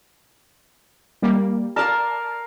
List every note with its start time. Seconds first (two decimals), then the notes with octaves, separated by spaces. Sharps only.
1.22 G3 A#3
1.76 A#4 D5 F5 A5